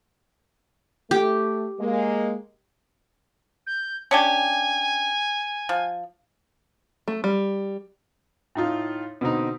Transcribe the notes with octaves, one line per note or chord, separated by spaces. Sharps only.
A3 G4
G#3 A#3
G6
C#4 D4 G4 G#5
F3
A3
G3
A2 D#4 F4
B2 D3 C4 D#4